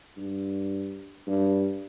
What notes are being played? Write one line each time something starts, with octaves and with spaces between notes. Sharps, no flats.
G2
G2